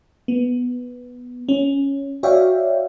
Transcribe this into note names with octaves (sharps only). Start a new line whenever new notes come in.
B3
C#4
F#4 C#5 D5 E5 F5 G5